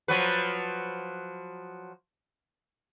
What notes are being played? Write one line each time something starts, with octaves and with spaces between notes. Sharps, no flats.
F3 F#3 B4